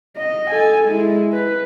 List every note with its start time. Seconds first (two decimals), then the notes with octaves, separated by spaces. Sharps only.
0.16 D#5
0.51 A4 G#5
0.85 G#3 E4
1.33 B4